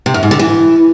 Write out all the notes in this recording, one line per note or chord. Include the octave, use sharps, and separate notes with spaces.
C3
F#2
G#2
D3
E3